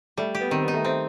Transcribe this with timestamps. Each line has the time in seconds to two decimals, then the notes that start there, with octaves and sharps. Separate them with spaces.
0.17 G3 A3
0.35 G4
0.40 B3
0.50 D#3 C4
0.62 B3
0.68 D#4
0.74 A3
0.80 B3
0.85 A3 C4